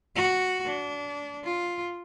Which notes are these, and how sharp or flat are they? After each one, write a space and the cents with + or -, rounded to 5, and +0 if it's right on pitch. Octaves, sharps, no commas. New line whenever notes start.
F#4 +0
D4 -25
F4 +0